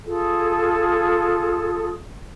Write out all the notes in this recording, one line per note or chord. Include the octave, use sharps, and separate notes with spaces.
F4 G#4 A4